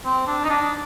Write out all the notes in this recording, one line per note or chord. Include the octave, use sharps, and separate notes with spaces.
C4
D4
D#4
D4